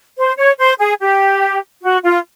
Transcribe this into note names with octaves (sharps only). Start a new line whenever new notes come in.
C5
C#5
C5
G#4
G4
F#4
F4